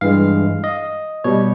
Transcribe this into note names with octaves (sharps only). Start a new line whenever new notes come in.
G2 E3 G#3 F5
D#5
B2 G3 C#5